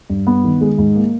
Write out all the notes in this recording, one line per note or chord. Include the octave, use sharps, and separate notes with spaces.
G2
B3
D#3
G#3
G#2
A#3